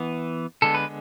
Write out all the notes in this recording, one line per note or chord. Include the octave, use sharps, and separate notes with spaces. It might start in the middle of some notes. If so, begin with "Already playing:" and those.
Already playing: E3 B3
D3 G#3 B3 A4
B4